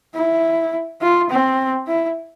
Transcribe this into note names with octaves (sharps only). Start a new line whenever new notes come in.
E4
F4
C4
E4